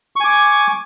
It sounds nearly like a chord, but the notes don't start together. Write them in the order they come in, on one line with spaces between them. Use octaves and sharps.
C#6 G#5 D6